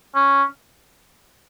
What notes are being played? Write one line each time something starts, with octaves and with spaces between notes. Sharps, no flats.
C#4